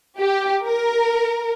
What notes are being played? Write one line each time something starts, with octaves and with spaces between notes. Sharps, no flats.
G4
A#4